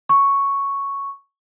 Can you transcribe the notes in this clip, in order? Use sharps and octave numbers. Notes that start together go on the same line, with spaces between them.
C#6